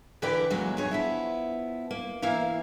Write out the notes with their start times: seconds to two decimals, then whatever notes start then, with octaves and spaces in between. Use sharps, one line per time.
0.22 D3 E3 G4 A#4 B4 D5
0.50 E2 A#2 F#3 G#3
0.77 G2 G#4 C#5
0.91 F3 B3 E4
1.91 A#3
2.22 E3 A#3 E4 F5